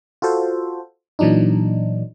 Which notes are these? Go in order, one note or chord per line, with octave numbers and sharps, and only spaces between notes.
F4 F#4 A4 C5
A#2 E3 F#3 D4 D#4